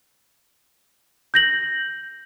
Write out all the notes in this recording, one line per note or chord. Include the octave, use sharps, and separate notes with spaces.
G6 A#6 F#7